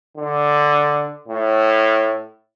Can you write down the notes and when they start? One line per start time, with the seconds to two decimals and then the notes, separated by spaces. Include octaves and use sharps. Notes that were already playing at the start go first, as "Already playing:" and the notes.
0.17 D3
1.28 A2